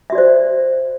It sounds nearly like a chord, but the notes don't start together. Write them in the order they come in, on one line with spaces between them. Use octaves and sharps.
E5 F#4 D5 C5